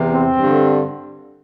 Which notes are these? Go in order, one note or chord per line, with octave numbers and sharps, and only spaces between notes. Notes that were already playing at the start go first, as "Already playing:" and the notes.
Already playing: E2 C3 E3
C4
G2 D3